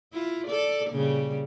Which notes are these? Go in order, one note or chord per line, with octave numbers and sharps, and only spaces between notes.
E4 F4
A4 D5
A#2 C#3 G3